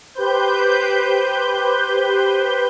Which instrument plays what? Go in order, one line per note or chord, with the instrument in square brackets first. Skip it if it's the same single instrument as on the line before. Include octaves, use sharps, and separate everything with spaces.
[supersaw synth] G4 B4 C5 G6